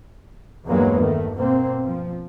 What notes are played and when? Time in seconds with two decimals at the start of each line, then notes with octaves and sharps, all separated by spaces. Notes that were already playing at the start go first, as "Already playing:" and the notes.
0.66 E2 G2 F#3 G#3 A#3 B3
1.01 D#3 A3
1.34 B2 A#3 C4
1.82 F3